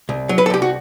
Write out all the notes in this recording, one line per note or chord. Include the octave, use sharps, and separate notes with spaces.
C2
F#3
B4
A4
C2 G4
F#4